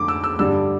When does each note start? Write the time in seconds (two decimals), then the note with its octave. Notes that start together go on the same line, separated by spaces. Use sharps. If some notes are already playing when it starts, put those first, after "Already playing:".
Already playing: F2 D3 A3 D6
0.08 E6
0.24 E6
0.39 G2 D3 G3 E6